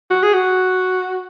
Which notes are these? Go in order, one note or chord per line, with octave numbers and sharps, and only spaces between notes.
F#4
G#4
F#4